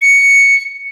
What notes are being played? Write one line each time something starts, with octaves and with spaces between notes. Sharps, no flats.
C#7